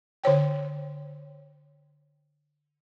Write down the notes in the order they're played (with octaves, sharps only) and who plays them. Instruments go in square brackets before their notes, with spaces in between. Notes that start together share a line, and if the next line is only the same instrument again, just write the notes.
[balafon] D3 C5 C#5 G5